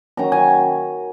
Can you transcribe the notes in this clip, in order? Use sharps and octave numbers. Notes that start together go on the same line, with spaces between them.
D#3 F#3 C#4 A#5
G#5